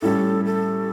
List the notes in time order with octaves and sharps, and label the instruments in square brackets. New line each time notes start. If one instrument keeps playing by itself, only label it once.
[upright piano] A2 G3 C#4 G4 [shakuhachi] A4
[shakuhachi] A4